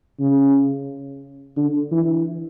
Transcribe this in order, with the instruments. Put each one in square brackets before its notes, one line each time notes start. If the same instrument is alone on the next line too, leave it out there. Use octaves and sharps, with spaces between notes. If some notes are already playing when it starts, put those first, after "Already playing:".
[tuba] C#3
D3
E3